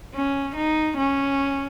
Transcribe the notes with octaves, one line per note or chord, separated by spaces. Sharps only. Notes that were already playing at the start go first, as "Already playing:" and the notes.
C#4
D#4
C#4